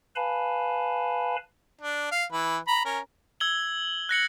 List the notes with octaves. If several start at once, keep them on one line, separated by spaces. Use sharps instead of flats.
B4 F5 G#5 A5 B5
D4
F5
E3 B4
A#5 B5
C#4 A#4
E6 G#6 F#7 G7
F#6 A#6 C#7 F#7